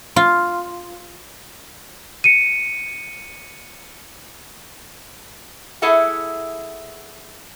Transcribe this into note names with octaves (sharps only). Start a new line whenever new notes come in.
F4
C#7 D#7
E4 G#4 A4 E5 F#5